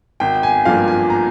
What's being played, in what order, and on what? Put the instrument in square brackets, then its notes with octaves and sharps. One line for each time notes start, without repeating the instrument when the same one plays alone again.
[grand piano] G#1 G5
G#5
G2 F3 A#3 D4 F5
G#5
A#5